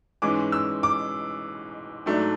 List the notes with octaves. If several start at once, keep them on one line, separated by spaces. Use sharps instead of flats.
G#2 E3 G#3 C#4 D6
E6
D6
G#2 F#3 A3 D4